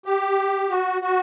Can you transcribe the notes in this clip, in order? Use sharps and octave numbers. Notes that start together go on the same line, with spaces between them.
G4
F#4
F#4